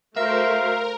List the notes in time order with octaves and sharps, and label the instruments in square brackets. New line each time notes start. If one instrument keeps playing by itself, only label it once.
[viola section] A3 F#4 C5 [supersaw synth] A#4 [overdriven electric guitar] E5 [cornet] F5